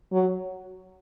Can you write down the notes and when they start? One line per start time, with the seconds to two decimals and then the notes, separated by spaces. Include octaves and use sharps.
0.12 F#3